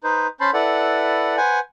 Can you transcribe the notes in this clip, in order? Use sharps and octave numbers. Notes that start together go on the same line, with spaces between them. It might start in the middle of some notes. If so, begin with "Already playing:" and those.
D#4 B4 C5
C#4 C5 A5 B5 C6
E4 A4 B4 D5 F#5
B4 C5 F#5 G#5